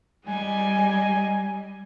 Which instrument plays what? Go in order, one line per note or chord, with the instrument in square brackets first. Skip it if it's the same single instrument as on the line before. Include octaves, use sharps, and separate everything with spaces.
[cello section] G3 [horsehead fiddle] D#5 G#5